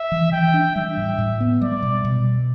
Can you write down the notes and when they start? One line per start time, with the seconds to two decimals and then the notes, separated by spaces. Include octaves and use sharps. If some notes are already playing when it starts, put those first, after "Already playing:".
Already playing: E5
0.12 E3
0.33 E3 G5
0.54 D4
0.76 G3 E5
0.97 A2
1.19 A2
1.40 B3
1.62 G3 D5
1.83 B2
2.05 B2